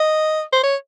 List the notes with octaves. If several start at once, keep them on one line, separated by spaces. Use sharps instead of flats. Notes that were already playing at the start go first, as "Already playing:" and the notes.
Already playing: D#5
C5
C#5